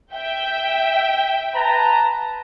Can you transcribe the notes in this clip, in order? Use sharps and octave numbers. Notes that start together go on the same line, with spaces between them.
E5 G5
B4 A5 A#5